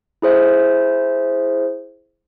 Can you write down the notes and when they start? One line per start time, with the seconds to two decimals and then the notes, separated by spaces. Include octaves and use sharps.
0.22 E4 G#4 C5 E5